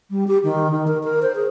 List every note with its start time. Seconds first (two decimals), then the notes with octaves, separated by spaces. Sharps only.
0.10 G3
0.27 G4
0.43 D#3
0.71 D#3
0.87 A#4
1.03 A#4
1.22 C5
1.35 G#4